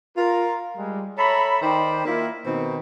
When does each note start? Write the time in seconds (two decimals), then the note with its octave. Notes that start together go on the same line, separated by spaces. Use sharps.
0.17 F4 A#4
0.76 G3 G#3
1.17 A4 C#5 E5 A#5 B5
1.61 D#3 D#4 C5 D5 G5 B5
2.05 A#3 E4 F4
2.44 B2 D#3 C4 D#4